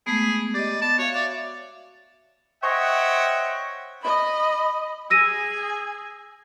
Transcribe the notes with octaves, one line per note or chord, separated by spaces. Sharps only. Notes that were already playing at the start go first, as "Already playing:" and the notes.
G#3 A3 B3 G#4
G4 D5 D#5
B3 A5
F#4 C#5 E5 F5
D5 E5
C5 C#5 D#5 E5 F#5 G5
D#5 B5
G#4 G#5 E6 A#6 D#7